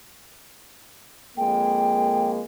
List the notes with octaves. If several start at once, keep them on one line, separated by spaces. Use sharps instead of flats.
F2 G#3 A#3 G5